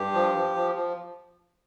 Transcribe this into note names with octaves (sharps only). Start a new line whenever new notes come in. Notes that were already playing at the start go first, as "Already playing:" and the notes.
Already playing: G2 G4
F3
F3
F3
F3